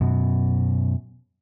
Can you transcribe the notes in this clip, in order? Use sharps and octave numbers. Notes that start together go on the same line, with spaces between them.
F#2 B2